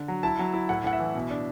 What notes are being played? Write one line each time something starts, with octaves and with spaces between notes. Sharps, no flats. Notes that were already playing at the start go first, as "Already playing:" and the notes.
Already playing: D3
F#3
E4 A5
F#3
E4
A2 F#5
A2 F#5
E5
E3
B2
D4